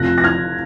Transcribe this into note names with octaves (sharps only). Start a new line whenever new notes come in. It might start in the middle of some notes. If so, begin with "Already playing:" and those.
Already playing: F1 F2 F3 F#6 A#6
A#6
F6 G#6